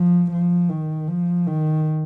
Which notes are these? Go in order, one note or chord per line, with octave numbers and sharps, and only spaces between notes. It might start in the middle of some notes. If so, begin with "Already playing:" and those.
Already playing: F3
F3
D#3
F3
D#3